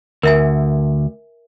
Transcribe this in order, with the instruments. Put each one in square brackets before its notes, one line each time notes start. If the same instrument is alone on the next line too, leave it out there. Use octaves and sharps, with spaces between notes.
[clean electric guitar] D2 [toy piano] A#4 E5 G#5